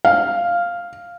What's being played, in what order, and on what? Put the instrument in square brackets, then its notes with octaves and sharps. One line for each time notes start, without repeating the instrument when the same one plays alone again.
[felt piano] F5